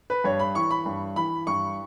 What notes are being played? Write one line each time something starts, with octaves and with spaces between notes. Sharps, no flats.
B4
G2 C#5
B5
E3 C#6
B5
G2
E3 B5
G2 C#6